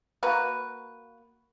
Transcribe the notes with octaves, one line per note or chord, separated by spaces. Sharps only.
A#3 F#4 B4